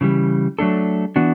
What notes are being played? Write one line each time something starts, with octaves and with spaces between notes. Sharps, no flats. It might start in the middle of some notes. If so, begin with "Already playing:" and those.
C#3 E3 G3
F#3 A3 D4 A4
E3 B3 D4 F#4